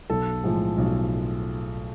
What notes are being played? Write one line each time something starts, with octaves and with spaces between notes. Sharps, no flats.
B1 A4
A2 F3 G#3
B1